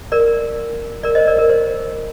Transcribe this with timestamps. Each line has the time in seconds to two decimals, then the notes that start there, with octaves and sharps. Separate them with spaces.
0.12 A#4 D5
1.03 A#4 D5
1.15 C5 D#5
1.27 A#4 D5
1.38 A#4
1.50 C5